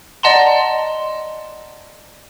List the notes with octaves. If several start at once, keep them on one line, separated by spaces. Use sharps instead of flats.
D5 D#5 F#5 A5 A#5 C6